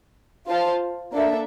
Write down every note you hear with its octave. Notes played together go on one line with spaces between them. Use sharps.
F4 C5 F5 A5
A#3 D4 A4 E5